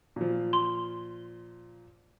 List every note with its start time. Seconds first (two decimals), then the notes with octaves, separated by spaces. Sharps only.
0.16 A#2 F3
0.53 C6